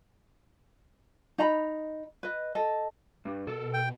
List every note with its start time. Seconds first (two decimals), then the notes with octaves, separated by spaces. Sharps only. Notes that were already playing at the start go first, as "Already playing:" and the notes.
1.38 D#4 D#5 A#5 B5
2.23 B4 D#5
2.55 A4 D#5
3.25 G2
3.47 B2 A4 A#4
3.74 G5